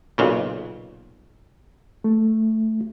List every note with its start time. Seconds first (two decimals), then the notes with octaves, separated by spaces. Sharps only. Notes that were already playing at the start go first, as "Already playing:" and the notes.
0.18 B1 A#2 C#3
2.04 A3